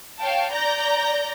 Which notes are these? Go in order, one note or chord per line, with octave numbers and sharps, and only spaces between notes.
C#5 F5 G5 A5
D5 A#5 G6 A#6